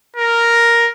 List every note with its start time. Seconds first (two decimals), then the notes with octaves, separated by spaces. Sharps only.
0.16 A#4